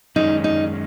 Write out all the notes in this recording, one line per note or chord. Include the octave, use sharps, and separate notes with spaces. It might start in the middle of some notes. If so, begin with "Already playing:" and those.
F#2 D#3 G#3 C#4 D#4
D#4